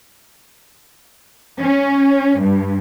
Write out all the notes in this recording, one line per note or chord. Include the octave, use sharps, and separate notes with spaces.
C#4
G2